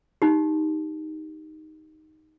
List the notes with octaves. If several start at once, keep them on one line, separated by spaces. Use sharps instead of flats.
D#4 G4